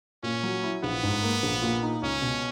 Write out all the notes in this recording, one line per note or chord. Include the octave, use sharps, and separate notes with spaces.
A#2 C#4
F#3
E4
A#1 B3
G#2
A#3
A#1
A#2
D#4
C#2 C#4
B2